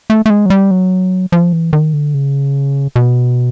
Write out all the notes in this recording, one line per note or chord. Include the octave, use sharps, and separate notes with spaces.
A3
A3
G#3
F#3
G3
F#3
F3
E3
D#3
D3
C#3
B2